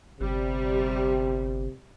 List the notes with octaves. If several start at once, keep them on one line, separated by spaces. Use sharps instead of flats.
G1 C3 G3